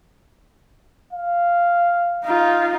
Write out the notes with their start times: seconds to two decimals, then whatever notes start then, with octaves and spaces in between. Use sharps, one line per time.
1.13 F5
2.24 D#4 F4